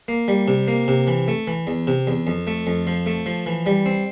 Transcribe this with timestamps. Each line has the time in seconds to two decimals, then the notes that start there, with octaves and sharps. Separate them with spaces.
0.08 A#3
0.28 G3
0.48 C3
0.68 A#3
0.88 C3
1.07 E3
1.28 A3
1.47 E3
1.67 E2
1.87 C3
2.07 E2
2.27 F2
2.47 A3
2.67 F2
2.87 F3
3.06 A3
3.26 F3
3.46 E3
3.66 G3
3.86 C4